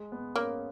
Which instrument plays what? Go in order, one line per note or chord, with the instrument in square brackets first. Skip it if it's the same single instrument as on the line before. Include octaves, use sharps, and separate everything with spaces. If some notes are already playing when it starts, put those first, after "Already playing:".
Already playing: [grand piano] G#3
B3
[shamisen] A#3 [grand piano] C#4